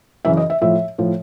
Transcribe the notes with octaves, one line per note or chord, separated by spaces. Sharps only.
F#2 C#3 E3 E5
D#5
E5
A2 F3 E5
A2 F3